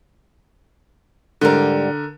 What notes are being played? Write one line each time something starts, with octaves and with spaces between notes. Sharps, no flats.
G#2 D3 G3 A#4